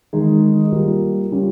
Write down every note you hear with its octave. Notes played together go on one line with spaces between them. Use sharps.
D#3 G#3 D#4 G#4
G3 A#3 F4 A#4
G3 C#4 F4